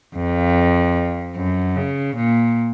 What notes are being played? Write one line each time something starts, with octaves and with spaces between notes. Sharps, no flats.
F2
F#2
C#3
A#2